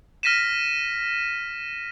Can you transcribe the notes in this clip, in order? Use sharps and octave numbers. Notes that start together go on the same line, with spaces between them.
F6 A#6 B6 D#7 E7